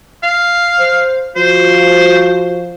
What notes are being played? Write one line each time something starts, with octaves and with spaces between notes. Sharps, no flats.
F5
C5
F3 F#4 C5